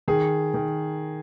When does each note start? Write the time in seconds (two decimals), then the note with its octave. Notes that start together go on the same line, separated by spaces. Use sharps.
0.08 D#3 G#4
0.54 D#3